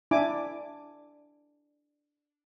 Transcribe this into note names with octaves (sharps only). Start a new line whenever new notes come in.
D4 E4 G#5 D6